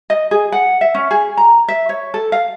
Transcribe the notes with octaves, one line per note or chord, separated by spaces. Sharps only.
D#5
G#4
F#5
E5
C#4
G#4
A#5
E5
C#5
A4
F5